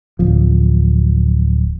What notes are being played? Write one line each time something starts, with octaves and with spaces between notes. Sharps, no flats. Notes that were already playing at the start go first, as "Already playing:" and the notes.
D1 F3